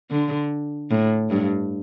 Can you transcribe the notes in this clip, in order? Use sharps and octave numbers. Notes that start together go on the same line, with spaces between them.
D3
A2
G2